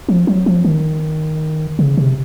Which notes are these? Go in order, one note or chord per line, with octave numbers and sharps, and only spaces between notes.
F3
F#3
F3
D#3
C#3
C3